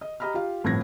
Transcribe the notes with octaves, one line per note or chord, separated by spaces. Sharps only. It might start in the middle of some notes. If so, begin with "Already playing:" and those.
D#5
G4 D#5 A#5 B5 F6
F4 G4 F5
G1 A2 F3 C4 G#6 A#6